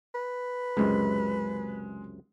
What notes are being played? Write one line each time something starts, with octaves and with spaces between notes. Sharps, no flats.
B4
C#2 F#2 C3 G#3